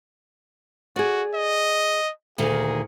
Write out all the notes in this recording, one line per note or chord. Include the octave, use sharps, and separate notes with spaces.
F#4 G#4 D5
D#5
D2 A#2 D#3 G#4